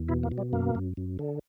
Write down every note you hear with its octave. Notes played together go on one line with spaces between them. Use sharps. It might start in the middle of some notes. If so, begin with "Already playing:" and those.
Already playing: E2
B2 E4
A#3
B2
G3
F#2 A#3
F#2
F#2
D3